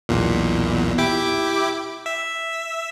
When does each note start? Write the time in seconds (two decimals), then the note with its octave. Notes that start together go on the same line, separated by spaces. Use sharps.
0.09 B1 E2 A#2
0.98 E4 G4 D6
2.06 E5